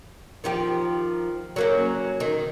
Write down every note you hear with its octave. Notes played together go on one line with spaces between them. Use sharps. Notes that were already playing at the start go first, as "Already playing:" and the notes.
D#3 F3 G4
F#3 A#3 C#4
D#3